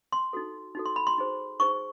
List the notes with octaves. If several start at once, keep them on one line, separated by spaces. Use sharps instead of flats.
C6
D#4 F#4 A4
D#4 F#4 A4
C6
B5
C6
D#4 G#4 C5
D#4 G#4 C5 C#6